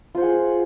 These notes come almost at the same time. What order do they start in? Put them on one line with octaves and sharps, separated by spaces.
F4 C5 F#5 G#4